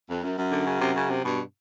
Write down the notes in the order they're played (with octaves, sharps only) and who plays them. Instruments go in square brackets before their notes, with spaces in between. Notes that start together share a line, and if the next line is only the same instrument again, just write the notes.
[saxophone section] F2
F#2
F#2
[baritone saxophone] D3
C#3
C3
C#3
C3
[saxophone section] G2 [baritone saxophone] B2